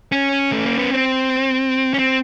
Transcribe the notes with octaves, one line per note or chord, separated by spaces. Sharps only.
C#4
A3
A#3
B3
C4
C#4
C4